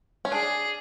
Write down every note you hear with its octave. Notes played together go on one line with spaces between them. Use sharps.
C#4
D4 G#4